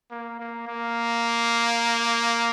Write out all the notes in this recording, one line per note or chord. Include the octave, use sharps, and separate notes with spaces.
A#3
A#3
A#3